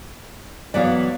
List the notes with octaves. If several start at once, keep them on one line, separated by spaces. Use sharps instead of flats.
E3 F#3 B3 D5 F5